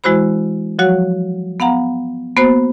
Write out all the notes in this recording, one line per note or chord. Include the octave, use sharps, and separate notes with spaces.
E3 G#3 E4 F#4 C5 B5
F3 F#3 F#4 C#5 F#5
B3 F5 F#5 A#5
A#3 B3 F#4 C5